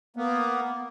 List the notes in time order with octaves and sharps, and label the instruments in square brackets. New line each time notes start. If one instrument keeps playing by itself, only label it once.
[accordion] A#3 B3